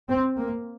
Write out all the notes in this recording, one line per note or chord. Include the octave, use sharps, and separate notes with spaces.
C4
A#3